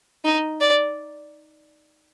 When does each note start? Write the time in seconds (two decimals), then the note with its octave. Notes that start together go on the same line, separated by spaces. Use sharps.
0.24 D#4
0.61 D5